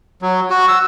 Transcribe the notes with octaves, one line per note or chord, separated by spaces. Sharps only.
F#3
F#4
E6